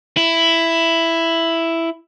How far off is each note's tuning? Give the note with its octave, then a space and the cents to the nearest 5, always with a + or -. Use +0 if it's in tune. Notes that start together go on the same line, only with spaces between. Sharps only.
E4 +5